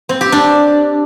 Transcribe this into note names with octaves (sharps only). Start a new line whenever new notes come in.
C4
G4
D4